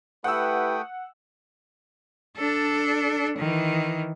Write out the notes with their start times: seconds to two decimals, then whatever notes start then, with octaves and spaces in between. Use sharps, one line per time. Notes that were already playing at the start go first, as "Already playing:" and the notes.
0.24 A3 E4 G4 B4 F#5 G5 D#6 E6
2.37 D4 A4
3.38 D#3 E3